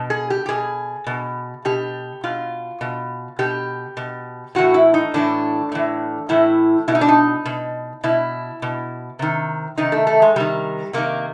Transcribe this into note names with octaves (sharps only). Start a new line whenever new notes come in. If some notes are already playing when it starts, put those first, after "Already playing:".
Already playing: B2
G#4
G4
G4
B2 G#4
B2
B2 G4
B2 F4
B2
B2 G4
B2
A2 E3 F#4
E4
D#4
A2 E3 D4
A2 E3
A2 E3 E4
B2 E4
D#4
D4
D#4
B2
B2 E4
B2
C3 D#3
C3 D#3 D#4
A3
A3
G#3
C3 D#3 G3
C3 D#3 A#3